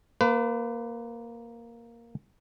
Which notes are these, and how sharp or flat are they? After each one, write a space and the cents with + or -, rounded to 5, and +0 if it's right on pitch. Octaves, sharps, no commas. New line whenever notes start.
A#3 +0 B4 +35